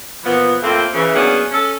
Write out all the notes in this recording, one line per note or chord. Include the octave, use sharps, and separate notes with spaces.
A#2 E3 F3 B3
F2 A2 A3 A#3 C4 C5
C#3 E3
F#3 A#3 B3 C#4 D4 G#4
C#4 A4